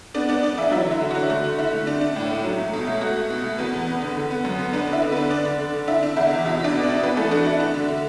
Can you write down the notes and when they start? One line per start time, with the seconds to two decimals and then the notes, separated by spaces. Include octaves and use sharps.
0.14 B3 D4 D5
0.29 B3 D4 D5
0.43 B3 D4 D5
0.58 E3 E4 E5
0.71 F#3 E4 E5
0.86 D3
0.91 E4
1.01 D3
1.11 D4 F#4
1.29 A3 F#4
1.44 D3
1.58 D3 E4
1.73 A3
1.87 D4
2.01 D4
2.16 A2
2.30 A3
2.44 F#3
2.58 A3
2.73 B2
2.87 A3
3.01 A3 F#4
3.16 A3
3.30 B2
3.44 A3
3.58 E2 B3 B4
3.74 B3
3.87 B3
4.01 D3
4.17 D3
4.30 B3
4.45 F#2
4.59 B3
4.73 B3 D4 B4
4.87 D3
4.93 E4 E5
5.02 D3
5.12 B3 D4 B4
5.30 D4 D5
5.45 D3
5.59 D3
5.74 D3
5.87 D4 E4 E5
6.03 D4
6.17 E2 E4 E5
6.31 E2
6.46 B2 E4 E5
6.60 B2 D4 D5
6.74 B3
6.84 B2 D4 D5
7.03 E3 B3 B4
7.17 E3 A3 A4
7.31 D4 F#4
7.45 D4 E4
7.60 D4
7.74 D3
7.88 D3